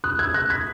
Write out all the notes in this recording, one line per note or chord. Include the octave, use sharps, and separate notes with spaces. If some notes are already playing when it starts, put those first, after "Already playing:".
D#6 F#6
E6 G#6
F#6 A#6
G#6 B6